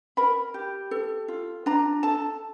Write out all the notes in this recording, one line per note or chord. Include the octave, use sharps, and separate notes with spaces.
A#4 B5
G4
A4
F4
D4 A#5
A4 A5